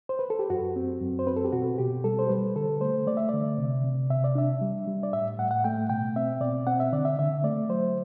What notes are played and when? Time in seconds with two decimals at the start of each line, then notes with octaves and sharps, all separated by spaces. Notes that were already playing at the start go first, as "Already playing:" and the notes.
0.09 C5
0.19 B4
0.30 A4
0.39 G4
0.50 F#2 F#4
0.76 C4
1.01 F#2
1.19 C5
1.27 C4 B4
1.36 A4
1.44 G4
1.52 B2 F#4
1.78 B2 G4
2.04 G3 A4
2.19 C5
2.29 G3 B4
2.56 D3 A4
2.81 A3 C5
3.07 A3 D5
3.17 E5
3.29 D3 D5
3.58 C3
3.84 C3
4.10 C3 E5
4.24 D5
4.35 D4 E5
4.61 G3
4.87 G3
5.03 D5
5.13 A2 E5
5.38 A2 F#5
5.51 F#5
5.64 A3 G5
5.89 B2 G5
6.16 C4 E5
6.41 B2 D5
6.67 C4 F#5
6.80 E5
6.93 D3 D5
7.05 E5
7.19 D3 E5
7.44 A3 D5
7.69 F#3 C5